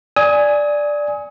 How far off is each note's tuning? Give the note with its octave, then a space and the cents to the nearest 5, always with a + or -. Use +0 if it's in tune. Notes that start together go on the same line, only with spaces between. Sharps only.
D5 +0 G#5 +0 D#6 +35